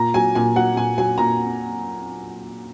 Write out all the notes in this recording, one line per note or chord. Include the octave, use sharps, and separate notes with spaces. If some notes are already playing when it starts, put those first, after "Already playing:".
Already playing: A#2 A#5
F#3 G#5
A#2 G#5
F#3 F#5
A#2 G#5
F#3 G#5
A#2 A#5